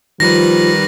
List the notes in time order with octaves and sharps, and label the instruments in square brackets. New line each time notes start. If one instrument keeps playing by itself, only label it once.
[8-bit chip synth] D#3 G3 B4 [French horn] F3 [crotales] A#6